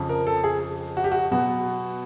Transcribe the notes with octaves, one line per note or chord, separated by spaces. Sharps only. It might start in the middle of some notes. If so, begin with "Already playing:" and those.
Already playing: F2 C#3 F3
A#4
A4
G#4
F#4
G4
F#4
B2 F#3 B3 F#4